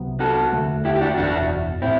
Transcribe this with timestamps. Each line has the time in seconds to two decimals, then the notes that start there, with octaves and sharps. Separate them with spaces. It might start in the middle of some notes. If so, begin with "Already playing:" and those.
Already playing: C2 C3 F#3 B3
0.20 F#4 A4
0.52 E1 D2 D3 A3
0.85 E4 G4
0.96 G4
1.01 D4 F#4
1.17 F#1 E2 B2 D4 F#4
1.82 A2 C4 E4